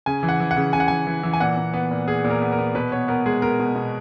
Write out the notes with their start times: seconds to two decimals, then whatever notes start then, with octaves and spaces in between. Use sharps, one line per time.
0.06 C#3 G#5
0.23 E3
0.29 F#5
0.40 E3
0.51 F#5
0.57 C#3
0.73 C#3 G#5
0.80 F#5
0.88 E3 G#5
1.07 E3
1.23 E3
1.33 G#5
1.40 A#2 F#5
1.57 A#2
1.74 B3
1.91 A#2
2.07 A#2 G#4
2.24 A#2
2.30 A#4
2.42 B3
2.52 A#4
2.58 B3
2.75 B2 B4
2.92 B3 C#5
3.08 B3 A#4
3.26 G#3 G#4
3.42 B3 A#4
3.59 B2
3.75 B2